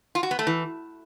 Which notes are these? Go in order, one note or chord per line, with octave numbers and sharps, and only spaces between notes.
F4
F#4
B3
A3
E3